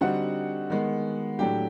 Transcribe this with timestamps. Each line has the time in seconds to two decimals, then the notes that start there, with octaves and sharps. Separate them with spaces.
0.01 D3 G3 C4 D#4 F#4 F#5
0.70 D#3 G#3 B3
1.39 A2 F#3 A3 D4 G4 G5